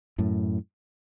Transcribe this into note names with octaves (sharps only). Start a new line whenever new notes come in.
F#2 A2